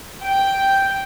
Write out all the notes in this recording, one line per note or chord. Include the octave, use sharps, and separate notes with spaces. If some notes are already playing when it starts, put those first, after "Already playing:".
G5